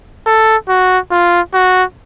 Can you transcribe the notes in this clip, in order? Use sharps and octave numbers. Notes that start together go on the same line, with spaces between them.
A4
F#4
F4
F#4